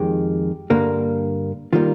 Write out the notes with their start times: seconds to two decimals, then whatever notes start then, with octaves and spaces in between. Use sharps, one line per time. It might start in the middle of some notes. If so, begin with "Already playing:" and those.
Already playing: F2 D#3 G#3 G4
0.70 G2 D3 G3 A#3
1.73 D#3 G3 A#3 F4